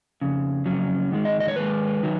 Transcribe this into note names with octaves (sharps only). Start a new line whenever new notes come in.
F2 C#3
F2 C#3 F#3 C#4
G#2 D#3 G#3
D#5
D#5
C#5
G#2 D#3 G#3 B4
D#3 F#3